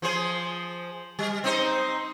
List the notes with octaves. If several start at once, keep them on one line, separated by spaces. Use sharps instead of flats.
F3 G#4 C5
G3
C4 D#4 C5